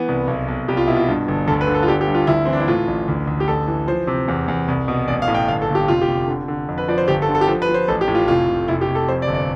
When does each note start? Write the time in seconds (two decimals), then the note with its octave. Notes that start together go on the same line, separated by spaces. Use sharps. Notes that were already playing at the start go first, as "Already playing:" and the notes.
Already playing: E3 B3
0.08 C2
0.27 B1
0.48 B1
0.68 C2 G4
0.77 F4
0.88 B2 E4
0.97 F4
1.08 G2
1.28 G1
1.48 D2 A4
1.61 B4
1.68 D3
1.75 A4
1.83 F4
1.88 G1 G4
2.01 G4
2.08 G2
2.14 F4
2.27 D2 E4
2.45 E3 C4
2.53 D4
2.60 E4
2.68 A2 F4
2.87 A1
3.08 D2
3.27 D2
3.40 G4
3.48 A1 A4
3.68 E3
3.88 F3 C5
4.07 C3
4.28 E2
4.48 E2
4.68 C2
4.88 B2
5.08 A1 D5
5.22 F5
5.28 A2
5.34 G5
5.48 G1 F5
5.62 A4
5.68 G1
5.75 G4
5.88 F1 F4
6.01 G4
6.08 F1
6.28 D3
6.48 D3
6.68 F2
6.78 B4
6.88 F3 D5
6.98 C5
7.08 G1 G4
7.22 A4
7.29 D3
7.35 A4
7.41 G4
7.48 F3 A4
7.62 B4
7.69 F3
7.74 C5
7.88 A1 A4
8.01 G4
8.08 A2
8.15 F4
8.28 F1 F4
8.49 F1
8.68 F1 E4
8.81 G4
8.88 F1
8.95 A4
9.08 F2 C5
9.22 D5
9.28 G1
9.34 D5